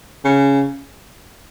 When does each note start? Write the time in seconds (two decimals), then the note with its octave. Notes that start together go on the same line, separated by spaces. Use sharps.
0.25 C#3